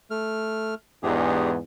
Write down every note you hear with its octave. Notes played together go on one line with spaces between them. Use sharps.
A3 F6
E2 G#2 D4 G4 G#4